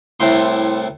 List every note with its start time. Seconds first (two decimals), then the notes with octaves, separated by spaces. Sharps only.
0.20 C2 A2 C6